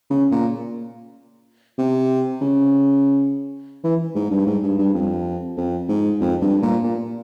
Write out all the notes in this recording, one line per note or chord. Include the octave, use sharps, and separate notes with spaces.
C#3
A#2
C3
C#3
E3
G#2
G2
G#2
G2
G2
F2
F2
G#2
F2
G2
A#2
A#2